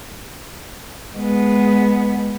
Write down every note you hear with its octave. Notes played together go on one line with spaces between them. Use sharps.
G#3 B3